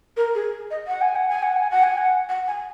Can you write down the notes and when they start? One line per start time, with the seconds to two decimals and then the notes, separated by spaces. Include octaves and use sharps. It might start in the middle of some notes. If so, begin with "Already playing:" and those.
0.17 A#4
0.35 G#4
0.71 D#5
0.87 F#5
1.01 G#5
1.16 F#5
1.29 G#5
1.43 F#5
1.57 G#5
1.71 F#5
1.83 G#5
1.98 F#5
2.29 F#5
2.47 G#5